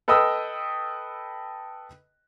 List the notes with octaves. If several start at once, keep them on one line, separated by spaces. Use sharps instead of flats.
A4 B4 D#5 G5 D#6 E6